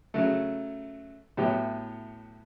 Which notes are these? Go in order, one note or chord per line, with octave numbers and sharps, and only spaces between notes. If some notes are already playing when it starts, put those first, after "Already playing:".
C#3 F#3 A3
A2 F#3 B3 E4 G4